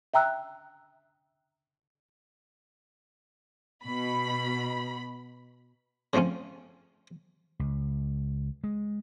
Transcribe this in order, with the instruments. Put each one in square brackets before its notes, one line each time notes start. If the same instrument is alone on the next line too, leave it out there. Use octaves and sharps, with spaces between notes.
[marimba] E5 G5 A#5 E6 F#6
[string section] B2 B5
[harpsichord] C#3 F3 A3 C4 C#4
[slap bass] C#2
G#3